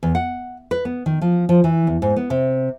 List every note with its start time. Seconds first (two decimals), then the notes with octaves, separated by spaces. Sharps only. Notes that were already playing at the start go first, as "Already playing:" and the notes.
0.03 E2
0.15 F#5
0.71 B4
0.85 B3
1.06 D#3
1.21 F3
1.49 F3
1.64 E3
1.87 E2
2.02 G#2
2.16 B3
2.30 C3